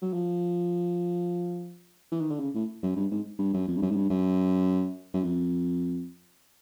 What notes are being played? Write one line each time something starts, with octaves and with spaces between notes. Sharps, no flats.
F#3
F3
E3
D#3
D3
C#3
A2
F#2
G2
G#2
G2
F#2
F2
G2
F#2
G#2
G2
F#2
F#2
F2